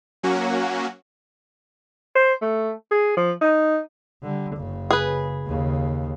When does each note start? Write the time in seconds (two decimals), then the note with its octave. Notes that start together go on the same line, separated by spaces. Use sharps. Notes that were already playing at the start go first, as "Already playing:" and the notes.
0.23 F#3 A#3 C#4 F#4
2.15 C5
2.42 A3
2.91 G#4
3.17 F3
3.41 D#4
4.23 D3 G3
4.57 F#1 C#3
4.91 G#4 B4
5.46 D#2 C#3